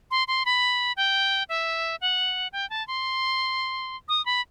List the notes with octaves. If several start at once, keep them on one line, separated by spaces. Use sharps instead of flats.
C6
C6
B5
G5
E5
F#5
G5
A5
C6
D#6
B5